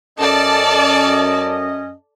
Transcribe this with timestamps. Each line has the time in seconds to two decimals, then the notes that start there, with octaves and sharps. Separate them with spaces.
0.19 F#2 C#4 A4 D5 D#5 A5